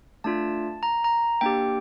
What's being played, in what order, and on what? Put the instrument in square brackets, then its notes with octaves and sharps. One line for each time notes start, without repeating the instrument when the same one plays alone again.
[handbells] A3 D4 F4 A5
A#5
A#5
A#3 D4 G4 G5